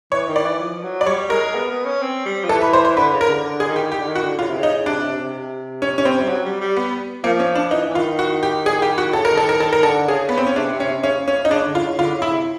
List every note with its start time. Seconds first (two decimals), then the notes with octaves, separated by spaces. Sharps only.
0.12 E3 C#5
0.28 D#3
0.36 D5
0.43 E3
0.60 F3
0.83 F#3
1.01 D5
1.06 G3 C#5
1.30 G#3 A#4
1.55 B3
1.71 B3
1.86 C#4
2.01 C4
2.25 G3
2.44 F3
2.49 E3 A4
2.61 B4
2.73 C5
2.85 C5
2.96 D3 B4
3.12 C#3
3.21 A#4
3.28 D3
3.44 D3
3.60 G#4
3.68 D#3
3.76 G4
3.92 G4
4.00 D3
4.08 D#3
4.15 F#4
4.23 D3
4.39 C#3 F4
4.48 C3
4.58 C#3
4.63 D#4
4.86 C3 D4
5.03 C3
5.18 C3
5.82 C#4
5.98 C#4
6.05 C4
6.20 G3
6.29 F#3
6.45 G3
6.61 G3
6.76 B3
7.24 F3 A#3
7.40 C#4
7.55 D4
7.71 E3 D#4
7.90 E3
7.95 D#3 F4
8.19 F#4
8.43 G4
8.66 G#4
8.82 G4
8.98 F#4
9.13 C#3 A4
9.25 A#4
9.30 D#3
9.37 A4
9.45 D#3 A#4
9.60 D#3 A4
9.73 A#4
9.83 D3 A4
10.08 C#3 G#4
10.29 B3
10.38 C4
10.47 C#4
10.56 C3 D4
10.72 C3
10.80 C#4
10.88 C3
11.03 C#3 C#4
11.28 C#4
11.45 D#4
11.51 C#3 D4
11.67 D3
11.75 F4
11.83 C#3
11.99 D3 F4
12.14 C#3
12.22 E4
12.30 C3